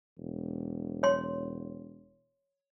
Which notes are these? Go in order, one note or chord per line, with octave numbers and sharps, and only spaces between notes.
E1
C#5 C6